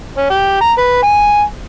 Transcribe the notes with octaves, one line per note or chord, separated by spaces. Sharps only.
C#4
G4
A#5
B4
G#5